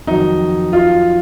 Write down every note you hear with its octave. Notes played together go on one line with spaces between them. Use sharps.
F2 D#3 F#3 D#4
F4